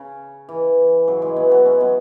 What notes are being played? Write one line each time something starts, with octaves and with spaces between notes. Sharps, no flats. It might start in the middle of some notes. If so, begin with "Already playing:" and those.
Already playing: C#3
E3
C#3 F#3
E3 G#3
F#3 B3
F#3 B3
G#3 C#4
F#3 B3